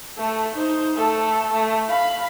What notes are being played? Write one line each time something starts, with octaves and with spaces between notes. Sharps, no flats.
A3 A4
D#4 C5
A3 A4
A3
F5 B5